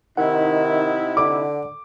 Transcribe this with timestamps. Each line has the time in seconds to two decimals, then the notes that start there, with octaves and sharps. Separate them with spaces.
0.17 C3 D#3 D#4 E4 F#5
1.17 D3 D6